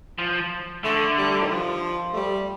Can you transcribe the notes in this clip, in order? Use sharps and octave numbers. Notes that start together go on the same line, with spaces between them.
F3
D3 A3
G3
D#3
F3
A3
G3